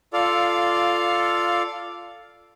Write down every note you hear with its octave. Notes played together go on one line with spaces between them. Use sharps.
F4 A4 D5 F5